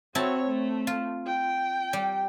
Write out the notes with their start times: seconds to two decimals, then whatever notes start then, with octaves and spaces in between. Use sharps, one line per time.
0.15 C4 E4 F#4 C#5 A5
0.48 A3
0.87 F4
1.27 G5
1.93 G3